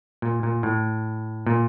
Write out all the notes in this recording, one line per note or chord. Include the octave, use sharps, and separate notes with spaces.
A#2
A#2
A2
A#2